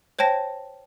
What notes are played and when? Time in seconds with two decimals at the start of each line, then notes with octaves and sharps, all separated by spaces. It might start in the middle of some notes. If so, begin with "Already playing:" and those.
0.19 C5 C#5 G5 A5 A#6